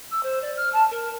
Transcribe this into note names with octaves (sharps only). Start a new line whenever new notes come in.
E6
C5
D5
F6
A5
A#4